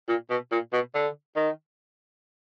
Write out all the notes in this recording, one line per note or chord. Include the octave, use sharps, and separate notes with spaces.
A#2
B2
A#2
B2
D3
D#3